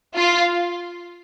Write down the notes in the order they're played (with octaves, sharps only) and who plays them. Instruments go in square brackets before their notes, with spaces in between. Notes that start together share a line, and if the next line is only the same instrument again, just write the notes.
[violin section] F4